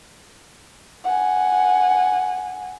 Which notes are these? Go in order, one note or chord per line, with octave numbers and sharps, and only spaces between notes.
F#5 G#5